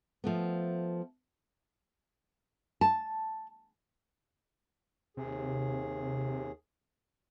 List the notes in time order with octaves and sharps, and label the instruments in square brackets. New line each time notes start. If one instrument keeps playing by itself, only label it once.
[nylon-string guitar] F3 A3 B3
A5
[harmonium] D#2 G#4 [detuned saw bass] C3